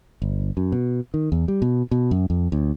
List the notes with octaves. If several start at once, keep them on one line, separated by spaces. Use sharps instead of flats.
G1
F#2
B2
D#3
E2
G3
B2
B2
F#2
F2
D2